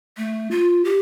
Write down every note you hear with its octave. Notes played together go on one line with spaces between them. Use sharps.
A3
F4
G4